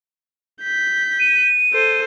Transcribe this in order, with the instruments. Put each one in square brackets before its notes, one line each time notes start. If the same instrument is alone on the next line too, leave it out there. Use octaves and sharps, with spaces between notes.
[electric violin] G6 B6
[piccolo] D#7
[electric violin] A4 C5